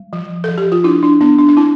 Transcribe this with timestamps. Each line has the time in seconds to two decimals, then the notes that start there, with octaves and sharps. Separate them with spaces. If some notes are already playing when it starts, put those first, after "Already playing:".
Already playing: G3
0.13 F3
0.44 F3 A4
0.58 G4
0.72 F4
0.84 D4 E4
1.03 D4
1.21 B3 D4
1.39 D4
1.49 D4
1.57 C4 E4